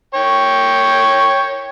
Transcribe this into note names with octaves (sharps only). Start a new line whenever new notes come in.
C#5 G5